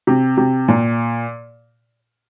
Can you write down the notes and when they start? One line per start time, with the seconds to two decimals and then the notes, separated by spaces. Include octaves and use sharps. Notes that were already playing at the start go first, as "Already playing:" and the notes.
0.07 C3
0.37 C3
0.68 A#2